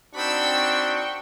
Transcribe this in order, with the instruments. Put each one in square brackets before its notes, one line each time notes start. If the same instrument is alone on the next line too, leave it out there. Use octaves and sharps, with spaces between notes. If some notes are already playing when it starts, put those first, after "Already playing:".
[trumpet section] C4 D#4 F#4 [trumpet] D4 [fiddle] G5 C#6 [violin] B5 E6